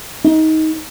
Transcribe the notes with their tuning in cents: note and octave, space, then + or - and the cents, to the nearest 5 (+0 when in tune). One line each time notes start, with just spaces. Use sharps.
D#4 +20